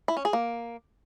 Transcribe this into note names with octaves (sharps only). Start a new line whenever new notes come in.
E4
C#4
G#4
A#3